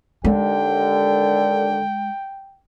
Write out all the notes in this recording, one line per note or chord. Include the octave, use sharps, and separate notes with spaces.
D#2 D3 G#3 G5